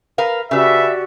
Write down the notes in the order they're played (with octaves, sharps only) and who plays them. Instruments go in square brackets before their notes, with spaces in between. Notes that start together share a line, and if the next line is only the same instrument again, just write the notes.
[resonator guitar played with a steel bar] A#4 B4 F5
[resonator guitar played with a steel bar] C#3 B4 [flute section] F#4 G4 D5 [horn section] E5